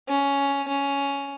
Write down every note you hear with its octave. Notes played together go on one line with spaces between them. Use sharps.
C#4
C#4